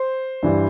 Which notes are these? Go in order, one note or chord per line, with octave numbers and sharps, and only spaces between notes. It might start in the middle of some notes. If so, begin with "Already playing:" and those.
Already playing: C5
G2 E3 G3